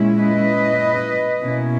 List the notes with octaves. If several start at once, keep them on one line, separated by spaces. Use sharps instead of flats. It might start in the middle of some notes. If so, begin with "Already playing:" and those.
Already playing: A#2 G#3 C#4 E4
B4 D#5
B2 A#3 C#4 E4